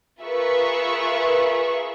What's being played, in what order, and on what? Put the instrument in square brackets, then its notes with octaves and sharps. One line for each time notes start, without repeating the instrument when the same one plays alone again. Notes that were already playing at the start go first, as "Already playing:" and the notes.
[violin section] F4 G#4 A#4 B4 E5 C#6